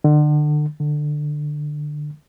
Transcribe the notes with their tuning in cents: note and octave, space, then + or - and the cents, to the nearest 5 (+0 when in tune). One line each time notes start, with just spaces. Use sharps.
D3 +35
D3 +20